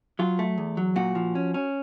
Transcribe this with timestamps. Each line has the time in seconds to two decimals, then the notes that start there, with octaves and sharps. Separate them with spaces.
0.19 F#3 F4
0.39 A3
0.58 E2
0.77 F#3
0.96 A#2 F#4
1.15 F3
1.35 C#4
1.54 C#4